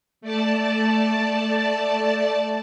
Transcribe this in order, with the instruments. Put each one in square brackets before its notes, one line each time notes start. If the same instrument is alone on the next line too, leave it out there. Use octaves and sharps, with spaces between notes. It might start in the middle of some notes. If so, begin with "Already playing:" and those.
[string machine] A3 D5 A5